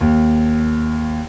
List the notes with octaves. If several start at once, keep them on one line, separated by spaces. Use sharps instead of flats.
D#2